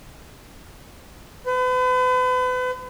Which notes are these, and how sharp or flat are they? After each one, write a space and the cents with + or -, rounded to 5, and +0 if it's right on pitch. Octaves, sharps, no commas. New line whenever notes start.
B4 +40